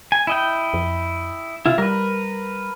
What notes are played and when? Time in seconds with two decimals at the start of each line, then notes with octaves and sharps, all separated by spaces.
0.12 G#5
0.27 E4 D#5 G5
0.74 F2
1.66 C3 E4 F4
1.78 G3 A#4 B4